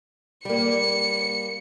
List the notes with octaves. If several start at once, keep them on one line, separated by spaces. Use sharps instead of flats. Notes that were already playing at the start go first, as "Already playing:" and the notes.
G3 A#3 C#7